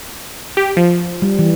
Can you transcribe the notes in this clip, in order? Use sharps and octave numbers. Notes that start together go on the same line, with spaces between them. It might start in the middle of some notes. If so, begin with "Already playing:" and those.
G4
F3
G3
E3